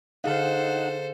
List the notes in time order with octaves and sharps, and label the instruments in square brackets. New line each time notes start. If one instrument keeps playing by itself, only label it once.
[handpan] D3 G#4 F5 [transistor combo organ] D#4 F#5 [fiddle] A4 C5